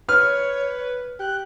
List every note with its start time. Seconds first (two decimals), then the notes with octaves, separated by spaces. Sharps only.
0.09 B4 C#5 F6
1.19 G4 F#6